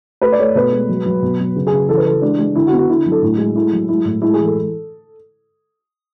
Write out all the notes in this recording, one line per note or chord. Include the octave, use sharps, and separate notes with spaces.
A3 B4
D5
A3 C#5
B2 B4
G#3
F#3
F#3
B2
F#3
C#3
G#4
C#3
E3 A4
B4
E3 A4
G#3 D4
G#3
D3 E4
F#4
B3
F#4
D3 E4
F#3
A4
A2 E4
G#3
A3 E4
F#3
G#3 E4
A2
G#3 E4
G#4
E3
A4